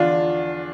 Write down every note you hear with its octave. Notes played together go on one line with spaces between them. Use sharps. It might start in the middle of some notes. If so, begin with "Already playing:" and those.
Already playing: E2 D3 F3 D4 F4